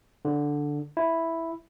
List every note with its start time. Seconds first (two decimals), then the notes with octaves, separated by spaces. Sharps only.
0.25 D3
0.97 E4